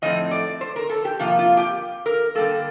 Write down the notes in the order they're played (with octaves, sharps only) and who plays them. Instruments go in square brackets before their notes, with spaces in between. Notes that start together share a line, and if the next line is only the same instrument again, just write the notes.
[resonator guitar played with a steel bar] A2 F3 A3 C4 D#4 D#5
D5
C5
A#4
A4
G4
C3 F3 A#3 F4
F4
G4
A#4
D3 G3 A#3 A4